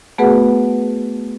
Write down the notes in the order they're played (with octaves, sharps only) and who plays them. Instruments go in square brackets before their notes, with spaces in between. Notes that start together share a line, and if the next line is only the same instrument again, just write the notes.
[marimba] A3 B3 F#4 G#4 B4 F#5